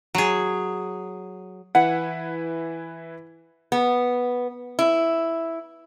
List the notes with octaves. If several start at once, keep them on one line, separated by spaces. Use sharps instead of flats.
F#3 G#4
E3 E4 B4 F#5
B3
E4